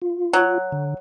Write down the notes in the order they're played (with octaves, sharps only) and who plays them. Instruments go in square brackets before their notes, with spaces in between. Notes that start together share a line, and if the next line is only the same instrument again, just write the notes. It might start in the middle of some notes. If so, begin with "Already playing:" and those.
[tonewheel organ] F4
[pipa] F#3
[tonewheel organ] D3